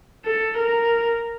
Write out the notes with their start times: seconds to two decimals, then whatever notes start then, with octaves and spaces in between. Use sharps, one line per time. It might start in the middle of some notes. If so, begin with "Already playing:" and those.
0.25 A4
0.57 A#4